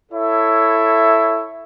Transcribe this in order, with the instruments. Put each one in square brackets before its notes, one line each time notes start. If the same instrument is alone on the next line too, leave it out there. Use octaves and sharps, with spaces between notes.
[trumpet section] E4 A4 C#5 E5